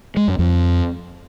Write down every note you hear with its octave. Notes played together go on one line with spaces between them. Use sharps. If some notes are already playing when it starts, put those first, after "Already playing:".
G#3
F#2
F2